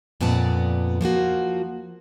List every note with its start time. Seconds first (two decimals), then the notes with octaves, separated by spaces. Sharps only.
0.21 F2 A#2 B3 D5 A5
1.01 F3 A#3 F4 F#4